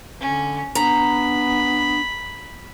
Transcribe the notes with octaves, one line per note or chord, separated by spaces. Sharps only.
D3 C#4
B3 D4 A#5 B5